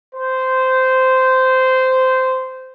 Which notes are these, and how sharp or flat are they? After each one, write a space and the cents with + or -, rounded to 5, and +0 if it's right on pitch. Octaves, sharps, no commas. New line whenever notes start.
C5 -15